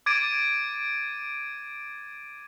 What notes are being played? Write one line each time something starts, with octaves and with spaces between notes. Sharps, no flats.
D6 G#6 A6 D7 D#7